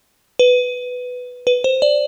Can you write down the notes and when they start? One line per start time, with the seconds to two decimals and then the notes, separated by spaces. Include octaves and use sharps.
0.39 B4
1.47 B4
1.64 C5
1.82 D5